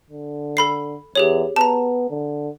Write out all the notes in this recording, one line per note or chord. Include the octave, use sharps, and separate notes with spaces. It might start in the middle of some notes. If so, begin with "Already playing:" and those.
D3
A4 B5 C7
E2 G4 G#4 C#5
B3 A5 A#5
D3